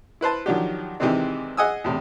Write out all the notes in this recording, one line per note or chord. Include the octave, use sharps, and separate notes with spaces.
E4 B4 C5 A5
D#3 F3 F#3 D4 F#4 G4
C3 D#3 E3 G#3 C4 D4
G#4 D#5 F#5 G#5 D#6 E6
E2 A2 C3